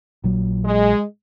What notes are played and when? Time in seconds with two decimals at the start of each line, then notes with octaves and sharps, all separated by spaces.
0.24 A#1 F#3
0.65 G#3